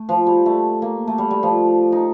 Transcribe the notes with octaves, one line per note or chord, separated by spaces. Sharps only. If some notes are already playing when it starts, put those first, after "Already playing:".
Already playing: A3
F3
G3
A3
A#3
A3
G3
G3
F3
D#4